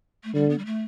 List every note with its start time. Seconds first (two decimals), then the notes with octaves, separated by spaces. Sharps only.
0.24 A3
0.34 D3 G3
0.49 B3
0.58 G3
0.65 A3